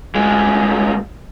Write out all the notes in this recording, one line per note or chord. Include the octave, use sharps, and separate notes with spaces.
D2 G#3